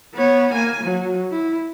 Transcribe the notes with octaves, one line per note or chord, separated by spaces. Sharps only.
B3 C#5
A#3 G#5
F#3
E4